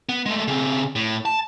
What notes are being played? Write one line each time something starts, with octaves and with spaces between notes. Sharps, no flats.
B3
G#3 A3
C#3 C4
A2
A5